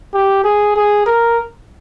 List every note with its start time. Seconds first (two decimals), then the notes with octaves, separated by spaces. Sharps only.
0.14 G4
0.44 G#4
0.76 G#4
1.06 A#4